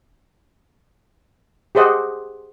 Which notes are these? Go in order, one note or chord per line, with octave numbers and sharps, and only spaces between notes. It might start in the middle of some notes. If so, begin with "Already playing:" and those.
G4 G#4 C5 D#5 F#5